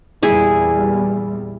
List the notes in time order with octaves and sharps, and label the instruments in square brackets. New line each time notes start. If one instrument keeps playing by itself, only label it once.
[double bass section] E2 A#2 G3 [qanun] E4 G#4